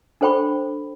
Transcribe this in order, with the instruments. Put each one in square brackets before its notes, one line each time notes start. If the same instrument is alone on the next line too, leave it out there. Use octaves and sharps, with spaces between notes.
[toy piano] D4 A4 C5 G5 B5 C#6